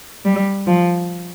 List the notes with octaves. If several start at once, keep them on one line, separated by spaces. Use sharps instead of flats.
G3
F3